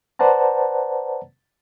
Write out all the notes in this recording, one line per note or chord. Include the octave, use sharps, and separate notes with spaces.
B4 C5 D5 F#5 A5 A#5